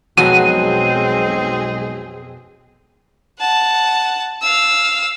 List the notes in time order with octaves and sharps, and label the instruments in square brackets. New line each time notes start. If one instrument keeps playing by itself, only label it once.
[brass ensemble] B1 G#3 [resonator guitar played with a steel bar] F2 B2 F#3 [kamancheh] C4 G#4 [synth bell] D#7
[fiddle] F#5 A5
F5 E6